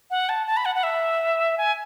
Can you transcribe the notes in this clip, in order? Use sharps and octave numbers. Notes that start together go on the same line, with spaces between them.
F#5
A5
A5
B5
F#5
F#5
E5
G#5